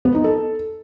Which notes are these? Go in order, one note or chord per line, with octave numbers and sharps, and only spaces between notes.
B3
D#4
A4